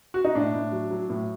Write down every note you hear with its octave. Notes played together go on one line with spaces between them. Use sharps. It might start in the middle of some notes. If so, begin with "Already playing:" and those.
F#4
D#4
A2 D4
A2
F#3
F#3
A2